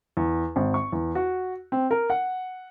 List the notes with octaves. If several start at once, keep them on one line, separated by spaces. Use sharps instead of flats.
E2
G#1
C#6
E2
F#4
C4
A#4
F#5